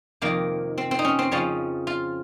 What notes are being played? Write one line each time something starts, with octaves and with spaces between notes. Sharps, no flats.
F2 C3 D#3 A#3
C4
C4
D#4
C#4
C4
F2 C#3 F3 C#4
F4